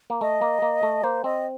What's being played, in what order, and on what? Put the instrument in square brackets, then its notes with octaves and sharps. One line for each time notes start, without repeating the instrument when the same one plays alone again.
[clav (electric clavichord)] A#3
[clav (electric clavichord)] A3 [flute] D#5
[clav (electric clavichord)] A#3
A#3
A3
[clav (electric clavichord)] A#3 [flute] C5
[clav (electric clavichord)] C4 [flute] D#5